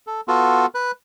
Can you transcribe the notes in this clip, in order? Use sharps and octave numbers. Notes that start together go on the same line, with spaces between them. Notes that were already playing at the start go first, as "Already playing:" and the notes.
A4
B3 F4 F#4 A4
B4 F#6